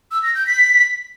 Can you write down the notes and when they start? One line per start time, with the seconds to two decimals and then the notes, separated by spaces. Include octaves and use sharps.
0.11 E6
0.23 A#6
0.35 G6
0.46 B6